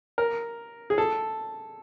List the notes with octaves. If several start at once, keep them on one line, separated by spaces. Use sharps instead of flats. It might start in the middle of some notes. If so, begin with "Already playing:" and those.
A#4
G#4
A4